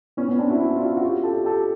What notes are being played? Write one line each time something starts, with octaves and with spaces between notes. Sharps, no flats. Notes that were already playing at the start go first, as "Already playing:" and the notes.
B3 C#4
B3 C#4
C4 D4
E4 F#4
D4 E4
F4
E4 F#4
F#4
F4 G4
G4 A4
G4 A4